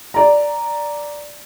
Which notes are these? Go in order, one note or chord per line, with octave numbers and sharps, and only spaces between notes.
D5 A#5